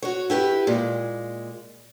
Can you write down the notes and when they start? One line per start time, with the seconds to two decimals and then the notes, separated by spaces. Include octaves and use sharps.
0.02 F#4 C#5
0.30 E4 G4 A#4 B4
0.67 A#2 G#3